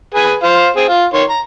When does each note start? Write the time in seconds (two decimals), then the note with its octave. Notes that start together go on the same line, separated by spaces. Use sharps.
0.14 G#4 B4 G#5
0.43 F4 C5 F5
0.76 C4 G#4
0.88 F4
1.13 D#3 C#5 C6
1.30 A#5